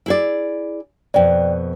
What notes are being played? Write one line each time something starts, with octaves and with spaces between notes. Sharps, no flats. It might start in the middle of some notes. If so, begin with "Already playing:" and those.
E4 G#4 D5
F2 B2 D5 G5